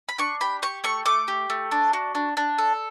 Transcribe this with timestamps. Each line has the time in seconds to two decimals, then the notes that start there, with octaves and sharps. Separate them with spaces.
0.09 B5
0.18 D4 C#6
0.41 G4 B5
0.62 G4 C#6
0.84 A3 C#6
1.06 A3 D6
1.28 G4
1.50 A3
1.71 D4
1.93 F#4
2.15 D4
2.37 D4
2.58 A4